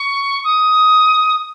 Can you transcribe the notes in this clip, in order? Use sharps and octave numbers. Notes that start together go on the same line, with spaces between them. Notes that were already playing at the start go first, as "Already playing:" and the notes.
Already playing: C#6
D#6